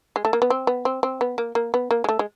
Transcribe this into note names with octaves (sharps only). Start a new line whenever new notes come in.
G#3
A3
A#3
B3
C4
B3
C4
C4
B3
A#3
A#3
B3
A#3
G#3
A3
G#3